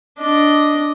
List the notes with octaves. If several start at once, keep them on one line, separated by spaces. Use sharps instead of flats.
D4 D#5